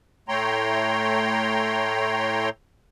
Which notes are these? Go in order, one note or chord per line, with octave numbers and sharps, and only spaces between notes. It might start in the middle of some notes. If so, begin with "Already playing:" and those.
A2 A3 C#5 G5 A#5 C6